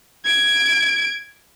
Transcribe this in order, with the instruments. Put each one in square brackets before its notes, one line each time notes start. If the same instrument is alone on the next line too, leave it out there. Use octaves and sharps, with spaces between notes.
[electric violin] G#6 D7